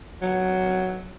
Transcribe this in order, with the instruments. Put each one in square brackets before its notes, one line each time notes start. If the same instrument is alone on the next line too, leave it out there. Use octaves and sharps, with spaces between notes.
[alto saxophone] F#3